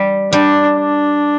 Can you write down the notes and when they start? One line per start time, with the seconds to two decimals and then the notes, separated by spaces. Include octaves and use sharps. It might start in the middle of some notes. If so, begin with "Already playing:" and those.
Already playing: G3
0.32 G3 D4
0.78 D4